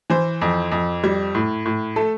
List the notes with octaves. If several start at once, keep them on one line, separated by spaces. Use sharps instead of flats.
E3 C5
F2
F2
G3
A2
A2
A3 A4